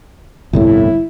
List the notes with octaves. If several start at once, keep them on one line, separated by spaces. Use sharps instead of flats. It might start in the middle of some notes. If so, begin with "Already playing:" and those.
G1 C2 A2 E4